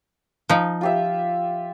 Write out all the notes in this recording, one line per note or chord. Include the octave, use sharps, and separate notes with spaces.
F3 D#4
F4 G4 E5